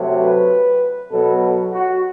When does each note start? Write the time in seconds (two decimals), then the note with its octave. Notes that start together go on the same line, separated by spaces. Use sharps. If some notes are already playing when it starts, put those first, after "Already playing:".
Already playing: C3 F#3 A3 C4
0.19 B4
1.11 B2 F#3 B3 A4
1.72 F#4